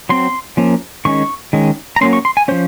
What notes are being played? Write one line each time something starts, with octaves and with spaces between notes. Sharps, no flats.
F#3 C4 C6
F3 A#3 C#4
D#3 G#3 C#4 C#6
D#3 G#3 C#4
A#5
F#3 A#3 C#4 C6
C#6
C6
G#5
F3 A#3 C#4 C5